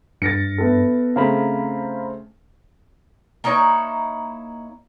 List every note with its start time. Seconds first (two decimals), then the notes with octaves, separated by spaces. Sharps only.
0.22 G2 A6 A#6 C#7
0.58 B3 E4 A4
1.16 C#3 A3 C4 F5 A#5 B5
3.44 A#3 D#4 E4 C#5